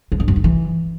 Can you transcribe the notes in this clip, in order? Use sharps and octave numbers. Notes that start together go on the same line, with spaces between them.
F3
G2
F#2
D#3
E3